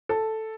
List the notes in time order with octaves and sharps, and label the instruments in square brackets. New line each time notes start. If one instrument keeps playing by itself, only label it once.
[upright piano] A4